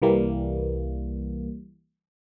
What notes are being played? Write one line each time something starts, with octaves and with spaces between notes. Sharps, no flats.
C2 E3 G3 A#3